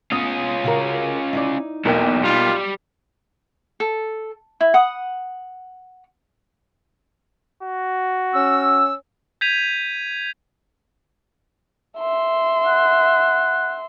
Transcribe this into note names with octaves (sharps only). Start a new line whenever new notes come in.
B3 C#4 F4 D#6
C#3 F#4 A#4
D#4 E4 D5
B1 E2 A#3 G5
G3 F4
A4
E4
F#5 D#6
F#4
C#4 E6
G6 G#6 B6 D#7 F7
E5 C6
F#5